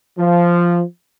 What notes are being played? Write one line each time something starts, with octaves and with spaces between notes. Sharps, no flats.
F3